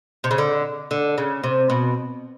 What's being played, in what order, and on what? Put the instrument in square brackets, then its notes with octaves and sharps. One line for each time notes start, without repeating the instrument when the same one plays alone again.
[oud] C3
C#3
D3
D3
C#3
C3
B2